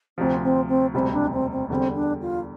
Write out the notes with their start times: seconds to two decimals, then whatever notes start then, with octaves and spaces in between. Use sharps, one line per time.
0.18 D2 C3 F3 C4
0.43 C4
0.68 C4
0.94 E1 D2 C3 G3 C4
1.13 D4
1.32 C4
1.51 C4
1.70 E2 D3 G3 C4
1.95 D4
2.21 F4